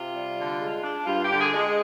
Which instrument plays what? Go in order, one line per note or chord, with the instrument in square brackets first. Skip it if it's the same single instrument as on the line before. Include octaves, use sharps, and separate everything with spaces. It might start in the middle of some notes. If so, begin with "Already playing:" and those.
Already playing: [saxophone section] C3 F4
G3
D3
G#3
D4
G2 F4
G4
D3
G#4
G#3